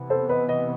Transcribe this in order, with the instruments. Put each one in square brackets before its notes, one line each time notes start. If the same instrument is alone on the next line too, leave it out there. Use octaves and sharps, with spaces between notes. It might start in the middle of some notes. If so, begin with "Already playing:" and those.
Already playing: [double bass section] C3 E3 B3
[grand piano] A4 C5
B4 D#5
B4 D#5